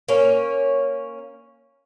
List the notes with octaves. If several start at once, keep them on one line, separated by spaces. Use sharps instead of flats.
A#3 C#4